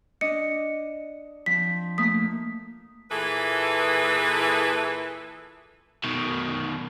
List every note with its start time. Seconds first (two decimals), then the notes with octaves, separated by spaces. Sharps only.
0.21 D4 D#5 C#7
1.46 F3 C4 B6
1.98 A3 A#3 D#6 B6
3.11 A#2 E3 E4 G#4 A4 B4
6.04 B2 D#3